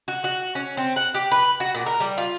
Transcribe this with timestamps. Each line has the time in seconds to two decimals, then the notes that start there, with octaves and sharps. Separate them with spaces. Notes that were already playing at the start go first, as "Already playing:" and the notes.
0.08 F#4
0.24 F#4
0.55 C#4
0.77 C4
0.96 F#5
1.14 G4
1.31 B4
1.60 F#4
1.75 A#2
1.86 A#4
2.00 G3
2.18 F4